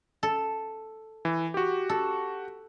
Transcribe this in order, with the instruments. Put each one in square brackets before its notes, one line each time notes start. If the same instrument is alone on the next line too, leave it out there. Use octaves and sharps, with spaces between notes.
[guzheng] A4
[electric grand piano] E3
F#4 G4
[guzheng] A4